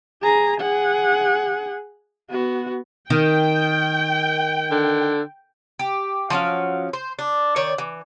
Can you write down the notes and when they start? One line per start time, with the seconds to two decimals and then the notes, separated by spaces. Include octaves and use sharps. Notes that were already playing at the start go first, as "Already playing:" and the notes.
0.22 G#4 A#5
0.61 G#4 F#5
2.31 B3 F#4
3.10 D#3 G5
4.71 D3
5.79 G4
6.30 F3 F#3 C#4 F5
6.93 C5
7.19 D4
7.56 D#3 C#5 D5
7.78 E3